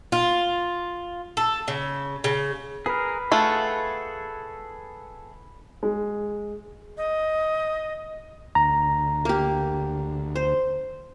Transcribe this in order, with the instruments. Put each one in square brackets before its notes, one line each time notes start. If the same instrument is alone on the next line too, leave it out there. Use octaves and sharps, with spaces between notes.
[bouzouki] F4
A4
C#3
C#3
[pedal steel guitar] G#4 A#4 [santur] B4
[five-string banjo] A3 F4 [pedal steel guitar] G#4 A4 F#5
[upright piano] G#3
[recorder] D#5
[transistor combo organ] D2 [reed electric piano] A#5
[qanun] A#3 G4
C5